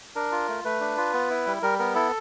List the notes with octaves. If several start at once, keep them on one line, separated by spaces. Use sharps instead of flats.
D4 A#4
F4
A3
A3 B4
D4
F4
B3
E4
G3
G3 A#4
B3 A#4
E4 A4